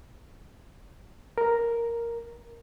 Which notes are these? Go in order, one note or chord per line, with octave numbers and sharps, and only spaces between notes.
A#4